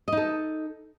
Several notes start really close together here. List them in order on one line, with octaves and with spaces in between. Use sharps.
D#5 D#4 A4